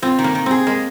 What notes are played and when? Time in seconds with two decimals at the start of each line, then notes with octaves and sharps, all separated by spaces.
0.02 C4 F4
0.18 D#3
0.24 A#3
0.35 D#3
0.46 C4 G#4
0.67 G#3 A#3